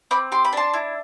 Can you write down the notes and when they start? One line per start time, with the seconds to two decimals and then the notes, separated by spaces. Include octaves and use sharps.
0.11 C4 B5 D6
0.32 G4 C6
0.45 B5
0.53 D4 A5 C6
0.74 E4